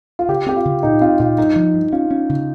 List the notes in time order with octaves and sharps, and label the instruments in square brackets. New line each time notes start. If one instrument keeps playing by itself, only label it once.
[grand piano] F4
[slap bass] C#3 [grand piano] G4
[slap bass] C4 [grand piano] G4
[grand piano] F4
[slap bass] C#3
[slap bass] A#2 [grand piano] D#4
[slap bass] C4 [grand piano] F4
[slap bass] A#2 [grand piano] F4
[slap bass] G2 [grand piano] D#4
[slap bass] F3
G2
[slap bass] C#4 [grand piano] F4
[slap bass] C#4
C#3